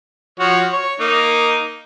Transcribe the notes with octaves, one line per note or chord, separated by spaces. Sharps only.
F3 F#4 C#5
C#5
A#3 D#4